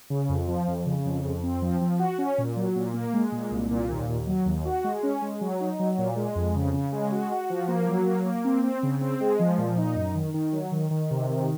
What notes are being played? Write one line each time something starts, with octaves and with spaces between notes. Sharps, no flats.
C#3
F2
F3
F2
C#3
F2
F2
C4
F3
F3
F#4
C#4
A#2
F#3
A#2
A#3
G#3
A#2
C2
A#2
D#2
D#2
F#3
D#2
F#4
G#3
C#4
G#3
F#3
D#4
F#3
A#2
G#3
F2
C#3
C#3
G#3
F#4
F#4
F3
A#3
F#3
A#3
A#3
C4
C4
C#3
C4
G#3
F3
A#2
D#4
F#2
D#3
D#3
F#3
D#3
D#3
C3
D#3